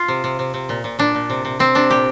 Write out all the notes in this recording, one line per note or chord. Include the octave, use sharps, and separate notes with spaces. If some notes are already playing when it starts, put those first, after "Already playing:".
Already playing: F4
C3
C3
C3
C3
A#2
A#2
A#2 D4
A#2
C3
C3
C3 C4
C3 D4
A#2 G4